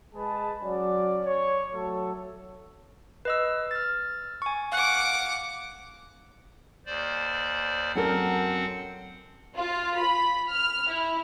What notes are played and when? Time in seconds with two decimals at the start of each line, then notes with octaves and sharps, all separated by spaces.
0.15 G#3 G#4 B4 A5
0.64 F#3 C#4 D5
1.26 C#5
1.74 F#3 A3 A4
3.25 B4 D#5 E6
3.71 F6 A6
4.42 G#5 C#6
4.72 F5 F#5 D6 F#6
6.86 D#2 C5 D5
7.95 F#2 C4 A4 A#4 F#5
9.55 F4
9.98 B5
10.49 F6
10.88 E4